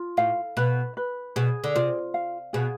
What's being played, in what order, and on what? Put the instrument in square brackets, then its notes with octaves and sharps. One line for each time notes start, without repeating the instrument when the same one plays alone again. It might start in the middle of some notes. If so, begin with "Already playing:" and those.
Already playing: [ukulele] F4
[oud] A2 [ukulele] F5
[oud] B2 [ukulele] B4
[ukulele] B4
[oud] B2 [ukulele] G#4
[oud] D3
[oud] C3 [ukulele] F4
[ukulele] F5
[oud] B2 [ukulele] G#4